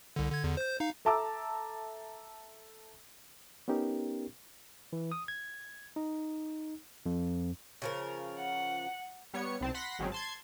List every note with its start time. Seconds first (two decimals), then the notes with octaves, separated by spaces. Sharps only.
0.16 C2 D3
0.31 D3 G#6
0.44 E2 D3
0.57 C5 G6
0.80 D#4 F5
1.05 A4 E5 A5 A#5 D6 E6
3.68 B3 C#4 D#4 G4 A#4
4.93 E3
5.12 D#6
5.28 G#6
5.96 D#4
7.06 F2
7.82 C#3 F3 A#4
8.39 F#5
9.34 G3 B3 C#5 C#7
9.61 C2 C4 A5
9.74 F#5 B5 C6 A#6 B6
9.99 G#1 F#3 G#3 C4 C#4
10.12 A5 C6 G#6